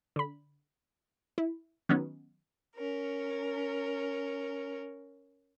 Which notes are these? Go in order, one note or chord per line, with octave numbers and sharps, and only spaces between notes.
D3 B5
E4
D#3 F#3 B3 C#4
C#4 A#4